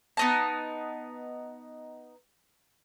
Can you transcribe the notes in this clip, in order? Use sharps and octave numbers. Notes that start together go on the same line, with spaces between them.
B3 D#4 A5